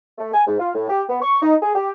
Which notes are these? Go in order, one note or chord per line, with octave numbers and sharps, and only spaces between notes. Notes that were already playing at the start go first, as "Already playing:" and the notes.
A3
G#5
G#2
F4
A2
G4
B3
C#6
D#4
G#4
G4